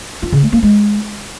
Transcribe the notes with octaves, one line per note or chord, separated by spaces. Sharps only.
F4
C#3
A3
A#3
G#3